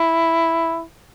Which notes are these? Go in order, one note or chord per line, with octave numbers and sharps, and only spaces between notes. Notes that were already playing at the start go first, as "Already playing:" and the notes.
Already playing: E4